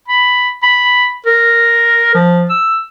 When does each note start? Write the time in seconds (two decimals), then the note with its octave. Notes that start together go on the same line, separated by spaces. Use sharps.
0.08 B5
0.63 B5
1.26 A#4
2.15 F3
2.50 E6